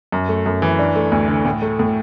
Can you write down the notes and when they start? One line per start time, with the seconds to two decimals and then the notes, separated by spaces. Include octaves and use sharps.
0.12 F#2
0.29 A3
0.46 F#2
0.62 E3
0.79 D4
0.96 A3
1.12 D2
1.28 D3
1.45 A2
1.62 A3
1.79 A2